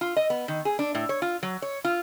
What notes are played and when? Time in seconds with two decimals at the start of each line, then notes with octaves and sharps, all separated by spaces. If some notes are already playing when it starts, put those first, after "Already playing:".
0.01 F4
0.17 D#5
0.30 B3
0.48 D#3
0.65 G#4
0.79 D4
0.95 A2
1.09 C#5
1.22 F4
1.43 F#3
1.62 C#5
1.85 F4